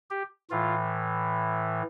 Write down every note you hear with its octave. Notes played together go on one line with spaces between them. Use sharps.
G4
A2 E3 F4